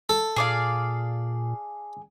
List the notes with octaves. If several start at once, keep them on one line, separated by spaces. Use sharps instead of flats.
A4
A#2 G#4 D5 F5